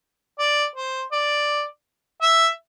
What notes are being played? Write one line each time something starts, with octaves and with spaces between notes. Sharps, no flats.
D5
C5
D5
E5